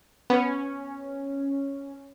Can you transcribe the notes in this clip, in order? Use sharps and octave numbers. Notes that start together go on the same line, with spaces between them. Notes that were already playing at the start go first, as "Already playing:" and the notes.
B3 C#4